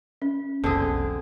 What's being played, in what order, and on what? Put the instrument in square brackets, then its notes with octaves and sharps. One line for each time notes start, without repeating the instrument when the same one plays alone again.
[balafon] C#4
[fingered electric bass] F1 B1 [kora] D3 C4 G#4